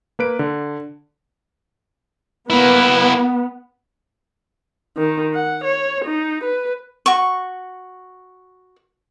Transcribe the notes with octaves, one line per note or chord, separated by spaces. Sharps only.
A#3 B4 D7
D3
A#3 B3 E4 B4
D#3
F#5
C#5
D#4
B4
F#4 C#6